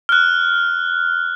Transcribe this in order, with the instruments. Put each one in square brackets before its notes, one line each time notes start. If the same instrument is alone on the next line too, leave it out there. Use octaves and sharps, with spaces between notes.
[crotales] F6 F#6